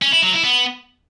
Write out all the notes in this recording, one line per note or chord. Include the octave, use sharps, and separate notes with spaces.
C#4
E4
F#3
E4
B3